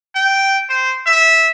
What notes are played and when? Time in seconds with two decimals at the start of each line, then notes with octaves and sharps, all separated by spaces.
0.15 G5
0.69 C5
1.06 E5